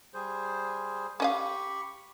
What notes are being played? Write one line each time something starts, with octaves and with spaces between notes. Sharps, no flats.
G3 G#4 C5
C#4 G4 D#5 F5 B5 C#6